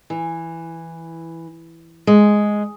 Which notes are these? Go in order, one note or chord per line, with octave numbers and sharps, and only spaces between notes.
E3
G#3